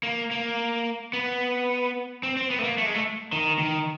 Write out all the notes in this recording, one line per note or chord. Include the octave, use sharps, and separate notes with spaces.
A#3
A#3
B3
C4
C4
B3
A3
A#3
A3
G#3
A3
D#3
D#3